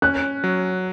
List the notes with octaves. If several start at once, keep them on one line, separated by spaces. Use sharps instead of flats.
C#4 F#6
F#3